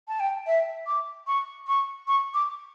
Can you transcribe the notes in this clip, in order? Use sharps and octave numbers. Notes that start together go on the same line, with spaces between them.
A5
G5
E5
D6
C#6
C#6
C#6
D6